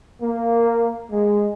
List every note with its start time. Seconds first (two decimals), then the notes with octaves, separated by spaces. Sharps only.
0.21 A#3
1.11 G#3